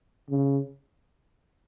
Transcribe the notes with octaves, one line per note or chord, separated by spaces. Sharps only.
C#3